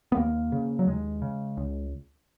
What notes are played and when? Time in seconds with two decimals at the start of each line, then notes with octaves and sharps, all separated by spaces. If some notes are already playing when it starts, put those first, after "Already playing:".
0.12 B3
0.17 D#2 A#3
0.52 C#3
0.79 F#3
0.87 D#2 G#3
1.22 C#3
1.57 C#2